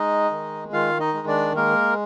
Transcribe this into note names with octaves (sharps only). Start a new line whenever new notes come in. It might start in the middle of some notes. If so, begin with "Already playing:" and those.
Already playing: G#3 D#4 D#5
D#3
D#3 F4 F5
D#4 D#5
G#3
D4 D5
G#3 A#3 A#4